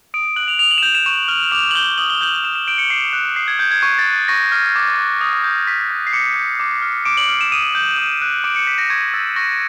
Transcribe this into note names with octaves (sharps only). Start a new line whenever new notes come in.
D#6 D7
D7
F#6 F#7
F7
D#6 F7
F#7
E7
G6 F7
E7
C#6 E7
F6
D6 F7
F#7
G6 G7
D#6 F#7
G7
G6 F#7
D#6 E7
E7
G6 D7
C#7
D6 C7
F#6
D#6 C7
G#6
G6
G#6
C#6 G#6
A6
F#6
A6
C#6 A#6
F6
D6
F#6
D#6
G6
C#6 B6
F#6
C7
D6 C#7
G6
D6
F6
D6 D7
F#7
F6
E7
D#6 D#7
G6
D#6
F#6
D6 D7
C#7
F#6 B6
A#6
C#6 G#6
E6 G6 A6
C#6 A#6